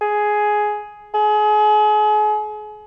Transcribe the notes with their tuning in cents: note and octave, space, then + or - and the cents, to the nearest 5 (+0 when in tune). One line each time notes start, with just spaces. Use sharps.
G#4 +10
G#4 +35